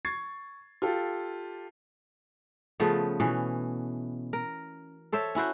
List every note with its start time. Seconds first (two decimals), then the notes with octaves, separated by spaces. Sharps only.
0.05 C#6 G#6 A6 C7
0.82 F4 G4 A4
2.80 C#3 F3 A3 B3
3.20 B2 E3 C#4
4.33 A#4
5.12 A4 C5 C#5 E5
5.35 C#4 E4 F#4 C5